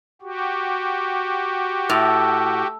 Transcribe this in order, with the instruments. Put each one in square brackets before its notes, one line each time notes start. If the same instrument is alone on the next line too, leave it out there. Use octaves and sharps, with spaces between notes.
[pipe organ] F#4 G4
[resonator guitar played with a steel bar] A2